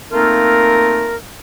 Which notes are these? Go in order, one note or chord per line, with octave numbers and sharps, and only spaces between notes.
A3 A#3 C4 D#4 F4 A#4